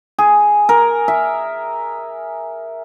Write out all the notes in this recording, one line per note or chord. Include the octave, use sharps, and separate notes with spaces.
G#4
A#4
E5